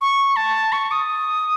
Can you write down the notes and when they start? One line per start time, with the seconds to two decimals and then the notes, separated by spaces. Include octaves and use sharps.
0.01 C#6
0.36 A5
0.72 C#6
0.91 D#6